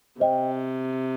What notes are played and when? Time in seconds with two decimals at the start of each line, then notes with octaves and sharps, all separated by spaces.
0.20 C3 C5 D#5 G5